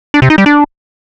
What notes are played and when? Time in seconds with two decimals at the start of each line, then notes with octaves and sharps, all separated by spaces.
0.14 D4
0.22 C3
0.30 D#4
0.38 G3
0.46 D4